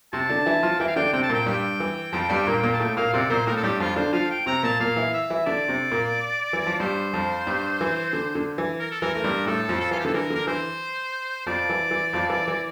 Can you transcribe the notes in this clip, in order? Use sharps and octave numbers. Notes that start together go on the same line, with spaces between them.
C3 C4 A5
D3 D4
E3 E4
F3 F4
E3 E4 G5
F5
D3 D4 G5
C3 C4 G5
A5
A#2 A#3 G5
G2 G3 G5
E3
F2 F3
G2 G3
A#2 A#3
A#2 A#3
A5
A2 A3 G5
A#2 A#3 F5
C3 C4 D5
A#2 A#3 C5
A2 A3 A#4
A4
G2 G3 G4
F2 F3 F4
D3 D4 C5
F3 F4 F5
G5
C3 C4 A#5
A#2 A#3 A5
A#2 A#3 F5
E3 E4
E5
E3 E4
D3 D4 D5
C3 C4
A#2 A#3
E3
F3
G2 G3 C5
F2 F3
G2 G3
E3
D3
D3
E3
A#4
A4
E3 A#4
A3 A#4
G2 G3
A2 A3 A4
F2 F3
A4
E3 F4
G4
D3 A4
E3 A#4
D3 A#4
E3 C5
F2 F3 D5
E3
E3
F2 F3
E3
E3